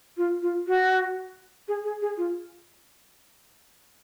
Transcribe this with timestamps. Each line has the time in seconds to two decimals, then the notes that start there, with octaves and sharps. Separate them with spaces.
0.17 F4
0.42 F4
0.67 F#4
1.68 G#4
1.84 G#4
2.02 G#4
2.17 F4